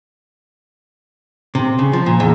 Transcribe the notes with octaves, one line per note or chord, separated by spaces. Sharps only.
C3
C#3
F3
A#2
E2